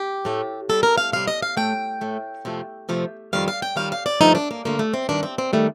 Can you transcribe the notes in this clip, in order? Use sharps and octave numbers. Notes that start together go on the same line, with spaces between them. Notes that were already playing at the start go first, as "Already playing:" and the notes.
Already playing: G4
A2 A3
C3 G3 A4
A#4
F5
C3 G3 F5
D#5
F5
A2 A3 G5
A2 A3
F2 C3 F3 A3
F2 C3 F3 A3
F2 D#3 G3 F5
F5
G5
F2 D#3 G3 F5
F5
D5
G2 D3 F3 A3 D#4
D4
A#3
G2 D3 F3 A3 A#3
A3
C4
G2 D#3 G3 D4
C4
C4
D#3 G3 A3